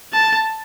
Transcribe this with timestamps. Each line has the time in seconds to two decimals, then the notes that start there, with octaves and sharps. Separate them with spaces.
0.13 A5